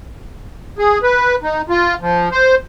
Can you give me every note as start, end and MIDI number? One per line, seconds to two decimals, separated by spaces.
0.79 0.98 68
1.03 1.36 71
1.43 1.62 63
1.69 1.94 65
2.01 2.29 53
2.32 2.55 72